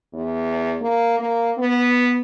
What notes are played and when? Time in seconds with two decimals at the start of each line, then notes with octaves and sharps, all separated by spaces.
0.13 E2
0.81 A#3
1.19 A#3
1.58 B3